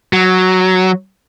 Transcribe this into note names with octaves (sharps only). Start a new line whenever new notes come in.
F#3